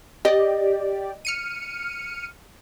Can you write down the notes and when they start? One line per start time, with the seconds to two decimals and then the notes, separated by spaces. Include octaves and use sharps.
0.25 G4 D5 D#5
1.25 F6 C#7 D#7